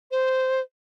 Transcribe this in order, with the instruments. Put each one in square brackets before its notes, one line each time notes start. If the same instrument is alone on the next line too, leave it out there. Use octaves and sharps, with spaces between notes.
[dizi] C5